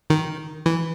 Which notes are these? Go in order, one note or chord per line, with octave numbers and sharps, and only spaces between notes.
D#3
E3